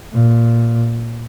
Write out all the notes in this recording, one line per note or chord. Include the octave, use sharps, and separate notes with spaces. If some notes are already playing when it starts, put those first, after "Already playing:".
A#2